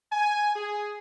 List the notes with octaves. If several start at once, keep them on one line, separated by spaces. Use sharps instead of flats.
G#5
G#4